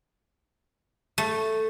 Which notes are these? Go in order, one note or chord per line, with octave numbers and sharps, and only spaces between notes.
A3